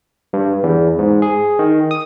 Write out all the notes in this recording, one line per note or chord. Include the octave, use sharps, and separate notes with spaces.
G2
E2
G#2
G#4
D#3
D#6